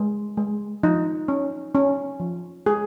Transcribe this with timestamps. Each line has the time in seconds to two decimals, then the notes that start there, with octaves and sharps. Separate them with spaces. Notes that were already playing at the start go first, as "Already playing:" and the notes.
Already playing: G#3
0.37 G#3
0.83 F3 D#4
1.28 C#4
1.75 C#4
2.20 F3
2.66 G#3 G#4